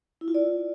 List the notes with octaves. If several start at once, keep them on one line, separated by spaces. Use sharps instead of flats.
E4
F4
D5